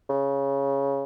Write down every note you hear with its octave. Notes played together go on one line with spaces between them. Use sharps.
C#3